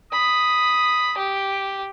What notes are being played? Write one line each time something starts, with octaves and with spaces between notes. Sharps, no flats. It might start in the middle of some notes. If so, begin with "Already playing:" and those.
B5 D#6
G4